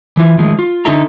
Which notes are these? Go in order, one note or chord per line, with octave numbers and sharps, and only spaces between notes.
E3 E4 F4
D#3 F3 G#3 A3
F4
D3 C#4 D#4 A4 E5 A#5